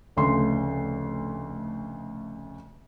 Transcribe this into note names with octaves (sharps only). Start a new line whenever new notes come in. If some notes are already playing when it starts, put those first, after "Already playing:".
F1 D2 C#3 A3 C6